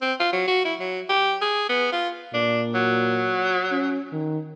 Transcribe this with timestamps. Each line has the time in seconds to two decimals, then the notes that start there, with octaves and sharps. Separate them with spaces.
0.01 C4
0.20 F4
0.33 F#3
0.47 F#4
0.65 E4
0.80 F#3
1.09 G4
1.42 G#4
1.69 B3
1.92 F4
2.34 A#2 D4
2.74 F#3
3.72 C#4
4.12 D#3